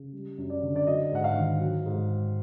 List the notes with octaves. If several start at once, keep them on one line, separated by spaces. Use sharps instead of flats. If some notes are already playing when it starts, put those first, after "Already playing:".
Already playing: C#3
G3
F#2
D5
D3
D5
F#3 D#5
G#2 F#5
F5
D#3
F#3
G#2